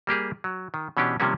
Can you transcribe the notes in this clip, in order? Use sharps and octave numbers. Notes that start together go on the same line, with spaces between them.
G3 A#3 G4 G#4
F#3
D#3
B2 E3 C#4 D4 G4
C3 D#3 F3 G3 A#3 C#4